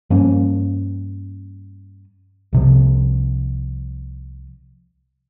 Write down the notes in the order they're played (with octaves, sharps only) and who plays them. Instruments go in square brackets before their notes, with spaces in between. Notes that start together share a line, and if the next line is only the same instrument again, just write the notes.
[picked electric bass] G2 F3 A#3 C#4
C2 C3 F3